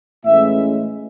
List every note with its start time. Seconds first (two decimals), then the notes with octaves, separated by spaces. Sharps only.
0.24 A2 E3 G#3 C#4 E5